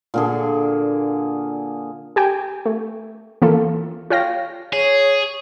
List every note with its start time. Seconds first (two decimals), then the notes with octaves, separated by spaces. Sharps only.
0.14 A#2 D3 G#4
2.16 G4 G5 G#5
2.66 A3
3.42 E3 A#3 F4 A4
4.10 F4 C#5 F5 G5 A#6
4.73 G#4 C#5